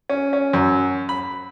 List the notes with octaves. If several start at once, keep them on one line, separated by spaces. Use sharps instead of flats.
C#4
C#4
F#2
B5